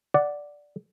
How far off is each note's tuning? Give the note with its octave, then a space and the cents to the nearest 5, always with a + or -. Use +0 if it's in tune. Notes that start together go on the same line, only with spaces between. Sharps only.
D5 +0 F#5 +0